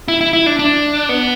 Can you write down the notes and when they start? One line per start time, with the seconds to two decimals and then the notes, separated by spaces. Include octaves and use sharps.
0.08 E4
0.21 E4
0.33 E4
0.46 D4
0.59 D4
1.09 B3